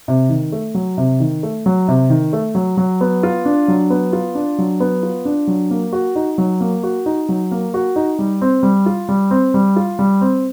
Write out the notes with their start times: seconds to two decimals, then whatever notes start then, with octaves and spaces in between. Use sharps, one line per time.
0.08 C3
0.29 D#3
0.52 A3
0.75 F#3
0.98 C3
1.20 D#3
1.43 A3
1.66 F#3
1.88 C3
2.10 D#3
2.33 A3
2.55 F#3
2.77 F#3
3.01 B3
3.23 F4
3.45 D4
3.68 F#3
3.90 B3
4.13 F4
4.35 D4
4.58 F#3
4.80 B3
5.03 F4
5.25 D4
5.47 F#3
5.71 A#3
5.93 F#4
6.16 D#4
6.38 F#3
6.61 A#3
6.83 F#4
7.06 D#4
7.29 F#3
7.51 A#3
7.74 F#4
7.96 D#4
8.19 G3
8.41 C4
8.63 G3
8.86 F4
9.09 G3
9.31 C4
9.54 G3
9.76 F4
9.99 G3
10.21 C4